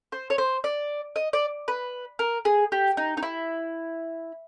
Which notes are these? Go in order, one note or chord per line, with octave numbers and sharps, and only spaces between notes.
C5
C#5
C5
D5
D#5
D5
B4
A#4
G#4
G4
D#4
D#4
E4